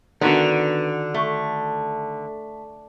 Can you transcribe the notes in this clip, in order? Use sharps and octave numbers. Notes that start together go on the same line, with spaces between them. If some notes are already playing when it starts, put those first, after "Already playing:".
D3 D#3 B3 D4 F#4
A3